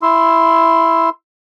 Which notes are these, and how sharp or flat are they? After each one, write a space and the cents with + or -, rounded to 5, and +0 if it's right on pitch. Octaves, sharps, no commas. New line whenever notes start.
E4 +5 C6 +0 E6 +0